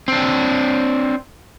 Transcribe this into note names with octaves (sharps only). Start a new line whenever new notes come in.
C4 D4